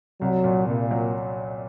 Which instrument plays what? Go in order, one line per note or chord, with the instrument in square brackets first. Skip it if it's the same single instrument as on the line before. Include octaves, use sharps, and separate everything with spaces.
[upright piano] C2 [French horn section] F#3
[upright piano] A#2
[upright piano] C2 [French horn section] A#2
[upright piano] F#3